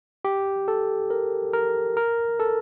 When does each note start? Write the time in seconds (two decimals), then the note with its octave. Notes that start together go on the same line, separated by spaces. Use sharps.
0.25 G4
0.68 A4
1.10 A#4
1.53 A#4
1.97 A#4
2.39 A4